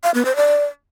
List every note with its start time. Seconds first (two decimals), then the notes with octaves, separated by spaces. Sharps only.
0.04 F5
0.14 B3
0.25 C5
0.36 D5